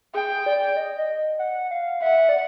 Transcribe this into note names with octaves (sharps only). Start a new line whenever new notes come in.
G#4 G5
D5
D#5
D#5
F#5
F5
E5 F#5
D5